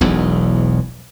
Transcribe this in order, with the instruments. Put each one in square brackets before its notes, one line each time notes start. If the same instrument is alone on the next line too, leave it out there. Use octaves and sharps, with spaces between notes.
[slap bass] E1 B1 E2